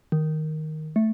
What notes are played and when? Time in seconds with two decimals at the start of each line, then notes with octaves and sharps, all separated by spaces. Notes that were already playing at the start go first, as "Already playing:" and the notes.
0.12 D#3
0.96 A3